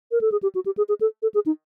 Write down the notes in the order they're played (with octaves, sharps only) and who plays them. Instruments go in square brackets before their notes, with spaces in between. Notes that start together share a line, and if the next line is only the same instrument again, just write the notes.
[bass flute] A#4
A4
G#4
G4
F#4
G4
G#4
G#4
A4
A4
G#4
D#4